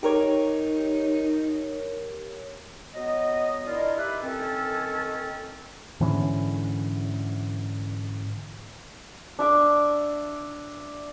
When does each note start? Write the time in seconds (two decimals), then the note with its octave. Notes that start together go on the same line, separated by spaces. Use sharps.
0.03 D#4 G4 A#4 C#5
2.94 F#3 B3 D#5
3.66 D4 E4 F4 A#4 D#5
3.96 D#4 G4 B4 E5
4.22 D#3 C4 C#4 A4
6.00 G#2 D3 E3 C#4
9.39 D4 E5 D6